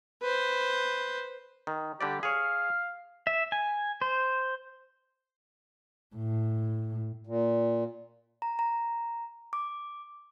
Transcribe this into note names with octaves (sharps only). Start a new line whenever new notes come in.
B4 C5
D#3
D3 G3 G4 D5
G#4 C#5 F5
E5
G#5
C5
A2
A#2
A#5
A#5
D6